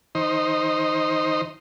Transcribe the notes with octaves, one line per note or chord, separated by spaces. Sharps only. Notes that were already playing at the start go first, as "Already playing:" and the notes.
D#3 D#4 C5